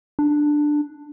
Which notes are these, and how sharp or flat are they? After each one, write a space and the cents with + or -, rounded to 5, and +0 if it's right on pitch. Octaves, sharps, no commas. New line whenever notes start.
D4 +10